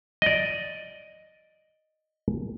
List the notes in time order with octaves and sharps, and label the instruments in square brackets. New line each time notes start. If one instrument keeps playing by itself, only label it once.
[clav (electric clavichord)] D5 D#5